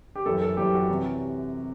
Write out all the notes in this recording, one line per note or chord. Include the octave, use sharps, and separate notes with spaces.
G4
F#2 E3 G3 A4
A4
F#2 E3 G3 G4
F#4
C3 E3 G3